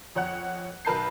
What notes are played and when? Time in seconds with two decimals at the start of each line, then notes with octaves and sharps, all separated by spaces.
0.15 F2 C#5 F#5 F#6
0.85 B1 A#4 B4 A5 G6 C7